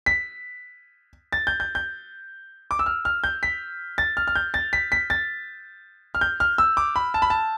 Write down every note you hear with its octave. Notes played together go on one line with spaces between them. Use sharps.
B6
A6
G6
G6
G6
D6
E6
F6
F6
G6
B6
A6
F6
F6
G6
A6
B6
B6
A6
F6
G6
F6
E6
D6
B5
A5
B5
A5